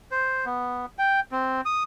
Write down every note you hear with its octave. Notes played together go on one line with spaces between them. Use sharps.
C5
B3
G5
C4
D#6